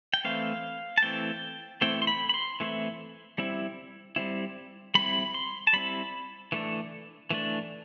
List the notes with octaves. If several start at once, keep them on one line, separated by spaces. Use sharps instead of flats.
G5
E3 A3 C4 E4 F5
A5
E3 A3 C4 E4 G5
E3 A3 C4 E4 G5
C6
B5
B5
C6
E3 A3 C4 E4
G3 C4 E4
G3 C4 E4
G3 C4 E4 B5
C6
A5
G3 C4 E4 B5
E3 A3 D4
E3 A3 D4